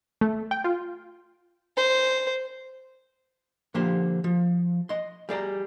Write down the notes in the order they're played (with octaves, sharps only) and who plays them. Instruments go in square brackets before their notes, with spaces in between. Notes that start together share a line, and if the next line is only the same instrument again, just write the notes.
[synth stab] A3
G5
F4
[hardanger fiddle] C5
[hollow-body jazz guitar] D3 F3 A#3 G4 C5 C6
F3
D#5 C6
G3 G#4 D5 A#5